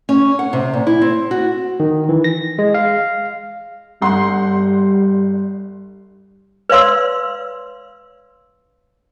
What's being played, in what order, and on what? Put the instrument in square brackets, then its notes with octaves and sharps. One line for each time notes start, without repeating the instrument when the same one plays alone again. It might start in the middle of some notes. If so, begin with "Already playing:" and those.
[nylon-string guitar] C#4
F#5
C3
A#2
E4
C4
F#4
[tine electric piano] D#3
E3
A#6
G#3
F5
[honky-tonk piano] G1 F#5 C6 [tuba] G3
[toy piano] B4 C#5 D5 F5 C6 E6